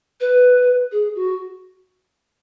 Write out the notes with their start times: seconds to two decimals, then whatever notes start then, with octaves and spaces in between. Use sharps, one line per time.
0.20 B4
0.92 G#4
1.15 F#4